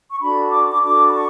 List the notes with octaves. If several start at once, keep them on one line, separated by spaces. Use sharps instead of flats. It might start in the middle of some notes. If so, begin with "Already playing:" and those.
C#6
D4 F#4 A4 B5
D6
D6
D4 F#4 A4 D6
B5
C#6